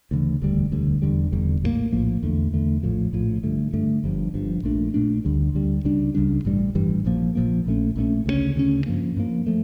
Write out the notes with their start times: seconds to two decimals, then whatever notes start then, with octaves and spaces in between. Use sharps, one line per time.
0.11 D2 C#3 E3
0.42 E1 D2 D3 G3
0.72 E1 D2 D3 G3
1.02 F1 E2 D3 G3
1.32 F1 E2 D3 G3
1.62 A#1 A2 F3 A#3
1.92 A#1 A2 F3 A#3
2.23 E2 D3 A3
2.53 E2 D3 A3
2.83 A#1 A2 F3
3.13 A#1 A2 F3
3.43 G2 D3 A3
3.73 G2 D3 A3
4.04 G1 G2 F3
4.34 G1 G2 F3
4.64 A#1 A#2 A3 D4
4.94 A#1 A#2 A3 D4
5.24 D2 D3 G3
5.55 D2 D3 G3
5.84 C#2 C#3 G3 D4
6.15 C#2 C#3 G3 D4
6.45 A1 G2 E3 G3
6.75 A1 G2 E3 G3
7.05 A#1 A#2 F3 A#3
7.35 A#1 A#2 F3 A#3
7.66 A#1 A#2 A3 C#4
7.96 A#1 A#2 A3 C#4
8.26 D2 C#3 G3 C#4
8.56 D2 C#3 G3 C#4
8.86 G2 F3 A#3
9.16 G2 F3 A#3
9.47 F3 A3